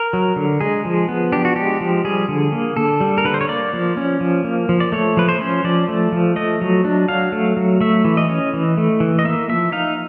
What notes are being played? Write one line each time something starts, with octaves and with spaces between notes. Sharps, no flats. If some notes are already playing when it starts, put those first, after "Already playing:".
Already playing: A#4
F#3
D3
G#3 G#4
F3
B3
D4 G4
F#4
G#3 G4
F3
G3 G#4
D3
A#3
D3 A4
G3
A#4
D3 B4
C5
C#5
A#3 D5
F3
C#4
F3
A#3
F3
D5
A3 C#5
F3 B4
C5
C#4
F3 D5
A3
F3
A3 D#5
F#3
D4
F#3 F5
A3
F#3
A3 E5
E3
D#5
C#4
E3
A3
E3
D#5
A#3 E5
F3 E5
D#4 F5